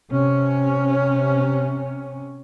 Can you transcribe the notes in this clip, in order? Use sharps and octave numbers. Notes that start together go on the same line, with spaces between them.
C3 C#4